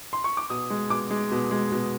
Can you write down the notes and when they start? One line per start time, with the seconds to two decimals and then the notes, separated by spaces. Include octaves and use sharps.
0.13 C6
0.24 C#6
0.37 D6
0.50 B2 D#6
0.70 G#3
0.90 B2 D6
1.11 G#3
1.31 B2
1.51 G#3
1.72 B2